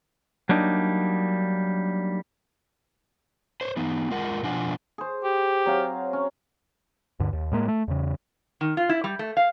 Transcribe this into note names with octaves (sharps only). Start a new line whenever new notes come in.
F#3 G3 A#3 D4 D#4
C5 C#5
E3 B3 D#4
G#3 F4 A#4 F#5
B2 F3 D4 F4 F#5 G#5
G#4 C5
G4
F#3 C4 F5
C#4
D2 G2 D3
D#2
A2 G#3 A#3
A3
E2 C#3
D#3
F4
E4
G3
A3
F5